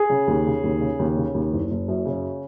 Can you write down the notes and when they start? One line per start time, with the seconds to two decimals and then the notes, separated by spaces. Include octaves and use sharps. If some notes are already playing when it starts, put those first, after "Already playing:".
Already playing: G#4
0.09 C#3
0.27 D#2
0.46 C#3
0.63 D#2
0.81 C#3
0.99 D#2
1.17 C#3
1.34 D#2
1.52 F#1
1.71 F#1
1.88 F#2
2.05 C#3